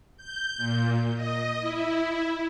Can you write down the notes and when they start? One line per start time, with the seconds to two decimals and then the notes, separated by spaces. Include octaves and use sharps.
0.17 G6
0.57 A#2
1.15 D#5
1.61 E4